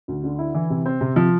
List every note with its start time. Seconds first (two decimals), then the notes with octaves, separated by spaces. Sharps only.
0.08 D2
0.24 D3
0.39 E4
0.54 E3
0.70 C3
0.86 C4
1.01 C3
1.16 F3